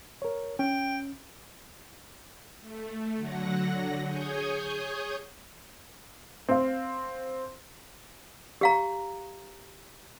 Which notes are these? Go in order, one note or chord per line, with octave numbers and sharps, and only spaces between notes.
A#4 C#5
C#4 G5
A3
D3 F#3 F#5 A#6
G#4 C#5 G#5 C#6 D#6 G6
C4 F5
G4 F5 A#5